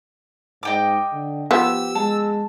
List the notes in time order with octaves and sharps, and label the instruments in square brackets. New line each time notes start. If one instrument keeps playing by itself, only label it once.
[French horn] G#2 [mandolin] D#5 G5 D6
[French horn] D3
[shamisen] F3 B3 [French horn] G4 [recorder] E6
[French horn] G#3 [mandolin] A5